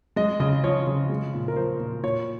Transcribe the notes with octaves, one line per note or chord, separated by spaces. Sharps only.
G#3 D#5
C#3 D#5
F3 C#5
C#3
G#3
A#2
A#4
F3 C5
A#2
A#2 C#5